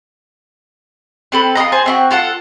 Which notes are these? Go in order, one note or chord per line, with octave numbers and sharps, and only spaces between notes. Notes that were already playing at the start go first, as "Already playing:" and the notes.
C4 A4 B4
F4 G4 D#5 A#5
G#4 C5 A5
C4 E4 F#4
F4 A4 F#5